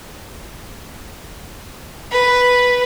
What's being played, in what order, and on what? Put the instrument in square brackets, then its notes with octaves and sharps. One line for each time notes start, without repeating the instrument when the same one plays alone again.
[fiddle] B4